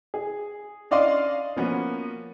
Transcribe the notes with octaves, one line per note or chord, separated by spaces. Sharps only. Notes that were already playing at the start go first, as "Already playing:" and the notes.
G#4
C#4 D4 D5 D#5 F5 C6
F3 A#3 B3 C#4 F#4